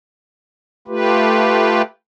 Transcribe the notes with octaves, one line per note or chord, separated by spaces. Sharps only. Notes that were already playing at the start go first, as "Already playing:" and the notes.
A3 F4 G4 B4